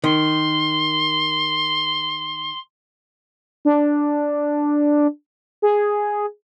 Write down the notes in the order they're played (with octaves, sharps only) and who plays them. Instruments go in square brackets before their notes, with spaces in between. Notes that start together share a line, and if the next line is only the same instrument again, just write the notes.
[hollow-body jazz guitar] D#3 [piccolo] C6
[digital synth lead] D4
G#4